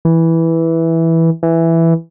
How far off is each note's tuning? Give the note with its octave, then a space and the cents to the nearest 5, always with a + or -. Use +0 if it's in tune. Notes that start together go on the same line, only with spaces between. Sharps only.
E3 -5
E3 +5